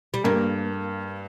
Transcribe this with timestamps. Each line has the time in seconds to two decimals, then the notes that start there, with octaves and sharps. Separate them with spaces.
0.14 G3
0.24 G2 A#3